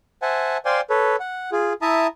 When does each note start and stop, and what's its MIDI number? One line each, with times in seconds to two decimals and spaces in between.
0.22 0.57 72
0.22 0.57 76
0.22 0.57 78
0.22 0.57 80
0.22 0.57 81
0.65 0.81 72
0.65 0.81 74
0.65 0.81 77
0.65 0.81 79
0.65 0.81 80
0.65 0.81 84
0.90 1.16 69
0.90 1.16 71
0.90 1.16 73
1.20 1.50 78
1.52 1.73 65
1.52 1.73 68
1.82 2.07 64
1.82 2.07 76
1.82 2.07 81
1.82 2.07 82
1.82 2.07 87